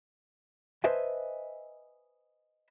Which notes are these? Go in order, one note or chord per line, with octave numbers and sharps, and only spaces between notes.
B4 C5 D#5 E5 G#5 A5